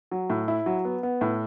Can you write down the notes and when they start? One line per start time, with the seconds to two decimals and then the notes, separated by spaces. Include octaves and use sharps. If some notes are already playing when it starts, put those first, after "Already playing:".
0.12 F#3
0.30 A2
0.48 E4
0.66 F#3
0.85 B3
1.03 B3
1.21 A2